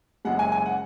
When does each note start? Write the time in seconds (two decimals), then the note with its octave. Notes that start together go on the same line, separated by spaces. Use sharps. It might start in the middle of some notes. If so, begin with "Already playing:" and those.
0.25 F#1 F#2 C#3 G#3 F#5
0.39 G#5
0.52 G#5
0.66 F#5